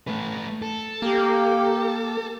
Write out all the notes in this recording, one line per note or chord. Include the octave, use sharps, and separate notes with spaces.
A3 B4
A4
A#3 G4